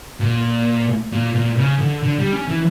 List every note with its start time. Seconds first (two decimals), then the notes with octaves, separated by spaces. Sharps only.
0.20 A#2
1.12 A#2
1.35 A#2
1.58 C#3
1.80 D3
2.03 D3
2.19 G3
2.33 C#4
2.48 E3